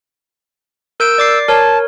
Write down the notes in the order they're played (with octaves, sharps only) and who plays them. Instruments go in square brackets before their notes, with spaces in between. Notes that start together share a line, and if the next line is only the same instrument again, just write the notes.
[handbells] A#4 G6 D7 [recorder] E6
[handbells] D5 D6 C7
[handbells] A#4 C#5 [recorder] A5